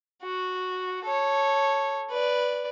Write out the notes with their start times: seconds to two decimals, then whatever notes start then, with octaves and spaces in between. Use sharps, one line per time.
0.22 F#4
1.04 A4 C#5
2.10 B4 D5